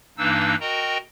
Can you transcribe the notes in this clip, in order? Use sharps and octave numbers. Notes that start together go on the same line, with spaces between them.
G2 E3 A#3 D4 D#4 E6
F#4 A#4 D#5 G5 A#5